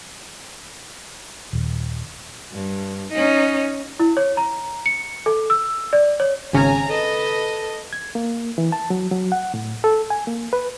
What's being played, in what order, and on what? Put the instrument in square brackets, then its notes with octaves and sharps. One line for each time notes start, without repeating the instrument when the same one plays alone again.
[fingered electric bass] D#1
[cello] G2
C#4 D#4
[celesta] E4
C#5
A#5
C#7
A4
E6
D5
C#5
[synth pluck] G#1 C#3 C#4 [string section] G#5 A#5
[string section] A4 B4 D#5
[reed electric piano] G#6
A#3
E3
A5
F#3
F#3
F#5
A2
A4
G#5
A#3
B4